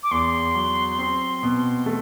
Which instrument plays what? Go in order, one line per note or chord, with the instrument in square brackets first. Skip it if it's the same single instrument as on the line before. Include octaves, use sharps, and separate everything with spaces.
[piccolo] D6
[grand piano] E2 [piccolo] C6
[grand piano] F#3
C4
B2
A3